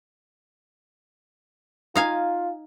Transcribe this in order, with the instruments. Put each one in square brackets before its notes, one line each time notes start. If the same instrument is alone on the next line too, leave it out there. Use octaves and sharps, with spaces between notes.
[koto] D#4 F5 G#5 [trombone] F4